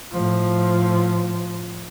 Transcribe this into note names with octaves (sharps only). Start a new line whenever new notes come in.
A2 F3